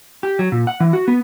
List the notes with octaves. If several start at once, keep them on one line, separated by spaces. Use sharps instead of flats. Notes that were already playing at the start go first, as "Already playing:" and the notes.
G4
F#3
A#2
F#5
E3
F#4
B3